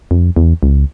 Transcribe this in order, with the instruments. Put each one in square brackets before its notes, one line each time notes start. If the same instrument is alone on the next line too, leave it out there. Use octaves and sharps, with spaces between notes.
[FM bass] F2
E2
C#2